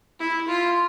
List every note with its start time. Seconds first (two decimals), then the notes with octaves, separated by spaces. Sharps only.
0.20 E4
0.47 F4